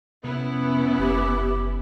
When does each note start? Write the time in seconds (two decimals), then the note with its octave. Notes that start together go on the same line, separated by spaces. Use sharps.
0.24 F1 C3 B3 C#4 E4
0.99 F#1 G4